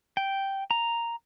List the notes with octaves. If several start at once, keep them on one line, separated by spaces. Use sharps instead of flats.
G5
A#5